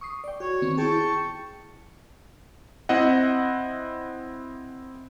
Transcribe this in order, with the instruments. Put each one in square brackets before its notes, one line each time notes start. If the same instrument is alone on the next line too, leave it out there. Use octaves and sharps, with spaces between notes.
[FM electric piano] C#6 D#6 C7
D5 G5
[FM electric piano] F#4 [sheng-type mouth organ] C#5
[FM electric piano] D#3 B3 C4
[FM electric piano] E4 G#4 [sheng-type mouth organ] G5 A5 C#6
[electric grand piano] C4 E4 D#5 F#5